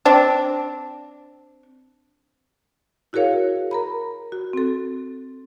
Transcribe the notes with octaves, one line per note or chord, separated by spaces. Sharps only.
C4 D4
E4 F#4 G#4 A#4 C#5 F5
A#4 A#5 B5
F#4
C4 A4